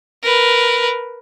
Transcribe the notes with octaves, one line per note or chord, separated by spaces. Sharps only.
A#4 B4